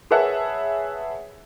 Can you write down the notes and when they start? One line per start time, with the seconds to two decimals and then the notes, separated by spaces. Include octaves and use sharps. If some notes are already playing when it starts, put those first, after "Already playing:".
0.11 G#4 B4 C#5 E5 F#5 A5